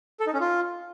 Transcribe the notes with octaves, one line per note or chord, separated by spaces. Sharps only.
A4
D#4
C#4
F4